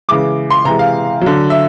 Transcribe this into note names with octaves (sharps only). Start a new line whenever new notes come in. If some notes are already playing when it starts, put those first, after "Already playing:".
C#3 E3 G#3 D6
C6
C3 E3 G#3 A#5
F5
D3 F#3
E5